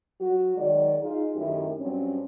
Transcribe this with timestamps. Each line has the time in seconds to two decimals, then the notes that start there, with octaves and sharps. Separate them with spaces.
0.20 F#3 F#4
0.57 D#3 F#3 G#3 F#4 D5
1.02 D#4 F4 G#4
1.35 F#2 D#3 A3 D#4 E4 G4
1.79 G2 F#3 C4 C#4